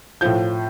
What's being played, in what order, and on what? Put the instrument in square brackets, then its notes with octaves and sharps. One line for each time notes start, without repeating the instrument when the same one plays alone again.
[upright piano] A2 F3 G6